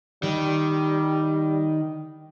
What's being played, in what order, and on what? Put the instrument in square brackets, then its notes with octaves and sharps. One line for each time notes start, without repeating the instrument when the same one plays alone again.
[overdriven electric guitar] D#3 [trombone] G3